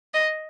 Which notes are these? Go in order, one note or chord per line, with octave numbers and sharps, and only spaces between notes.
D#5